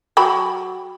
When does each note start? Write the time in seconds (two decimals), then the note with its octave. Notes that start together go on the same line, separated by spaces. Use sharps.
0.17 F#3 G5 B5